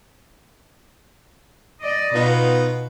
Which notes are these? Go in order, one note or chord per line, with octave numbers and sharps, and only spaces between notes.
D5 D#5
B2 B3 D#4 F4